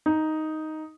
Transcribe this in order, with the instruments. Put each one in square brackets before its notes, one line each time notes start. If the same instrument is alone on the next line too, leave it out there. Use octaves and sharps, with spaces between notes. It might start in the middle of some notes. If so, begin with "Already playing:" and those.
[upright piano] D#4